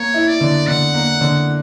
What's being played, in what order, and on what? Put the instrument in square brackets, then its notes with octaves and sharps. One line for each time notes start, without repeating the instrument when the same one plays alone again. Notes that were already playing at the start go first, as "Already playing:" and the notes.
Already playing: [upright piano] A#3 [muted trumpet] C#5
[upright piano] E4
[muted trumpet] D5
[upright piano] D3
[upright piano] D3 [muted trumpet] F#5
[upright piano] A#3
D3